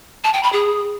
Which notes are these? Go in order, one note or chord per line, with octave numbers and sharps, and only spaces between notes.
A5
G5
B5
G#4